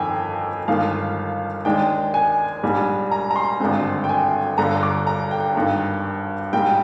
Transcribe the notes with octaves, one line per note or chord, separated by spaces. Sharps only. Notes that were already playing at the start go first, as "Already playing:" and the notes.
Already playing: G1 F2 D#3 G5 G#5
G1 G2 D#3 G#3 F5
D#2 D#3 G#3 D4 G5
G#5
A#1 G#2 G3 D4
A#5
A#5
C6
G#1 G2 D3 G#3 C4
G5
G#5
G1 G2 D3 A#5
D6
A#5
G5
G#1 G2 D#3
A#1 G#2 G3 G5